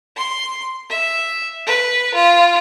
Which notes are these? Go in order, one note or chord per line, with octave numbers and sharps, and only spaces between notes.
C6
E5
B4
F4